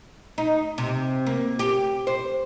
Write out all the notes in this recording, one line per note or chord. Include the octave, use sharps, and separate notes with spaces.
D#4
C3
A#3
G4
C5